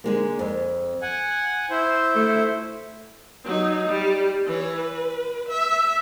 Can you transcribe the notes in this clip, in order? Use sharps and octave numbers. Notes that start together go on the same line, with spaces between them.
D3 G#3 A#3
F2
F#5 G#5
E4 C5
A3
F#3 D#4
G3
E3 C#5
B4
E5